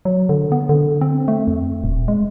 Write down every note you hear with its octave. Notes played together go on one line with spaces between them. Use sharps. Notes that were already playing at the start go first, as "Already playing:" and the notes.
F#3
D3
B3
D3
C4
A3
F2
D#1
G#3